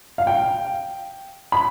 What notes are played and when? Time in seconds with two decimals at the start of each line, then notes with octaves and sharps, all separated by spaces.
0.18 F5
0.27 G5
1.52 B5